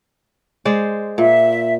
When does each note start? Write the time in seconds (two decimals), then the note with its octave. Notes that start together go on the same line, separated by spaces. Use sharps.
0.65 G#3 C5 D5
1.18 A#2 E5